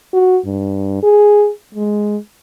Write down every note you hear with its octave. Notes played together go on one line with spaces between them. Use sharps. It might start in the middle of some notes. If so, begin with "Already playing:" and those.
F#4
G2
G#4
G#3